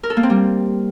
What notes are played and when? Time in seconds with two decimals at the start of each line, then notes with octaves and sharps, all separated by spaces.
0.03 A#4
0.10 A4
0.17 A#3
0.23 C4
0.30 G3